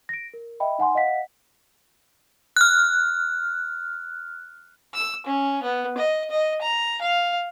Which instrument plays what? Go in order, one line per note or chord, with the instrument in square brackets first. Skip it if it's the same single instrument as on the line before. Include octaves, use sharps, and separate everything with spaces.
[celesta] A#6 D7
A#4
D#5 E5 G5 B5
D#4 F#5 G#5 C6
D#5 F5 F#5 B6
[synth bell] F6 F#6
[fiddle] E6
C#4
B3
D#5
D#5
A#5
F5